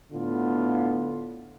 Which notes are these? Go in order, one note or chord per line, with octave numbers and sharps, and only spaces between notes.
A2 D3 B3 F4